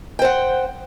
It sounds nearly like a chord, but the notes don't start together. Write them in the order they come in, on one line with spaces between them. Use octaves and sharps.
G5 C5 F#5